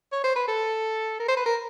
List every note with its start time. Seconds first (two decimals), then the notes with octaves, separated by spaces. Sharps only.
0.12 C#5
0.24 C5
0.36 B4
0.48 A4
1.19 A#4
1.28 C5
1.37 B4
1.46 A#4